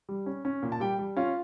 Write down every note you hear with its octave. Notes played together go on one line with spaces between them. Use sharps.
G3
C#4
C#4
A#2
A5
G3 G4 G5
G3
C#4 F4 F5